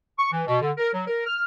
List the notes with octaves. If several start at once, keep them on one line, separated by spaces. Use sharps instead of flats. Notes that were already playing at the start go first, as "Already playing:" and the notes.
C#6
E3
B2
D3
A#4
F#3
A#4
F6